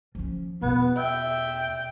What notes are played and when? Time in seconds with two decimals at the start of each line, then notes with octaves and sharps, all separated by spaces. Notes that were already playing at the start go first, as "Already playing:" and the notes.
0.15 F3 C#4
0.62 E2 B2 B3
0.97 E5 G5